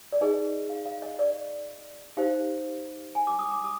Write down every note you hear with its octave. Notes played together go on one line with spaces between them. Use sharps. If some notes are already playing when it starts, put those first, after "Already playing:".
D5
D#4 G#4 B4 D#5
F5
F5
D#5
D5
D#4 G4 C5 F5
G#5
D6
D#6
D6
D#6